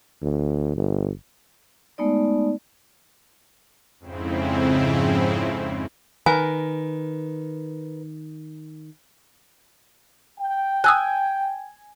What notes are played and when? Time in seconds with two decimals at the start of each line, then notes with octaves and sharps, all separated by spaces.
0.22 D2
0.75 G1
1.98 G#3 A3 B3 D#4 D5
4.00 F2 G#2 C#3 C4 E4
6.26 D#3 A#4 B4 G#5
10.39 G5
10.84 G#5 D#6 E6 F#6